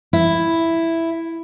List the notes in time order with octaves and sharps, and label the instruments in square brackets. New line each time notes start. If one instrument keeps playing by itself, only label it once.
[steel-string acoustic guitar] E4